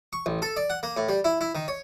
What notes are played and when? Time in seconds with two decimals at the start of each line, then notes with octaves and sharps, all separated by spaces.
0.13 C#6
0.26 A1
0.42 A4
0.57 D5
0.70 F#5
0.83 A#3
0.97 A2
1.09 G3
1.24 E4
1.41 E4
1.55 D#3
1.68 C#5